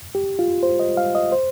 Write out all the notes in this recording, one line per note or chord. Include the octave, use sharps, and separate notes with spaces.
G4
F4
C5
D#5
F5
D#5
C5